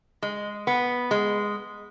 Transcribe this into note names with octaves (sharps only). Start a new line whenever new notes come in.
G#3
B3
G#3